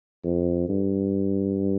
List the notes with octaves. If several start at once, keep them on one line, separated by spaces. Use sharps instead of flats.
F2
G2